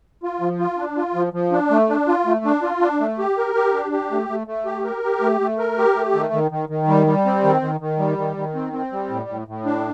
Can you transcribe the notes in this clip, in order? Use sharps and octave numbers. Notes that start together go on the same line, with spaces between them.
F4
F3
F4
D4
F4
F3
F3
D4
A3
D4
F4
A3
D4
F4
D4
A3
G4
A#4
G4
D4
G4
A3
A3
A3
G4
A#4
G4
A3
A3
A#4
G4
A3
D#3
D#3
D#3
D#3
G3
G3
C4
D#3
D#3
D#3
G3
D#3
D#3
C4
C4
G3
A2
A2
A2
D4